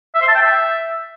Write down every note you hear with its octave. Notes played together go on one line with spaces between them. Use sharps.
E5
C5
A5
G5
E5